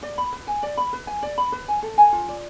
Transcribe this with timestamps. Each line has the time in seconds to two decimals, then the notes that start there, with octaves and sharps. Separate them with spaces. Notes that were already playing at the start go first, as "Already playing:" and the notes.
0.03 D5
0.18 B5
0.33 B4
0.47 G#5
0.63 D5
0.77 B5
0.93 B4
1.07 G#5
1.23 D5
1.38 B5
1.52 B4
1.68 G#5
1.83 A4
1.98 G#5
2.12 F4
2.29 D5